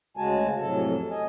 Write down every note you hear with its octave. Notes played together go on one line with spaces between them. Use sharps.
D2 C#3 G#3 F#4 G#5 A5
F2 A2 C3 F#3 A4 A5
D#5 G#5